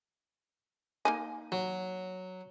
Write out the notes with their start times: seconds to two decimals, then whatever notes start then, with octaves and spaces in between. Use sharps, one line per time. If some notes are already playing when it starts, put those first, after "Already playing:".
1.05 A#3 D#4 G#5
1.52 F#3